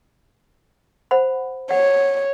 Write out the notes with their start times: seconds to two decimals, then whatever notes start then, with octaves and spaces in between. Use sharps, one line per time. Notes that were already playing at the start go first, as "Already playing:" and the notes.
1.11 C5 F#5 B5
1.71 C#5 F#5